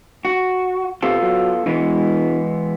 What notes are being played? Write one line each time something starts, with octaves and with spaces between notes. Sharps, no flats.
F#4
C3 B3 F4 A4
F#3
E1 E3 G#3 B3